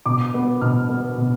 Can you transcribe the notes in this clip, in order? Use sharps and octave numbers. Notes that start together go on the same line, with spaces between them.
B2 D6
B3
B2 F6
B3
B2